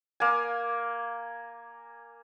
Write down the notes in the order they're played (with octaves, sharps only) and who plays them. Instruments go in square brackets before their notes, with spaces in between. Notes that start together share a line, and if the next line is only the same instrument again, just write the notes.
[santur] A#3 G#5